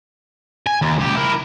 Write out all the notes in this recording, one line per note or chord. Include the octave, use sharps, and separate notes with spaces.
G#5
D#2
C#2 G4
E4 A#4